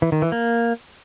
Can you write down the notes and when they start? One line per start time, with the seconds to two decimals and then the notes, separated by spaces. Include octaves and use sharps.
0.02 E3
0.12 D#3
0.22 E3
0.32 A#3